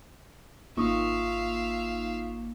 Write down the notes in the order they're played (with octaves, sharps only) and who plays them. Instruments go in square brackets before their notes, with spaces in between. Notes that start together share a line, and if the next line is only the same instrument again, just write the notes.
[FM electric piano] G#1 A#3 D#4 [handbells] F4 C#6 D#6 [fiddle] E5 F5